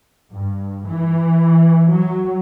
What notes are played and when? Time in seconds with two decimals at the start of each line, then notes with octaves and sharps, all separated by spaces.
0.33 G2
0.87 E3
1.91 F#3